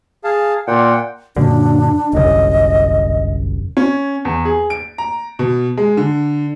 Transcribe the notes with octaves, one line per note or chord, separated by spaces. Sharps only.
G#4 F5 A5
A#2 F#5 G5
F#2 A#2 D3 D4
G1 C2 F#2 D#5
C#4
E2
G#4
D7
A#5
B2
G#3
D3